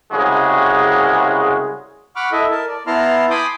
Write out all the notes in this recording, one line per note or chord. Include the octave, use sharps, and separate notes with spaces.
C2 C#3 G#3 F#4 G#4
F#5 B5 C#6 D6 F6
E4 A4 D#5 E5
A#4 A5
D5
B3 E4 A5 A#5 C6 F6
G#5 B5 C6 D6 D#6 G6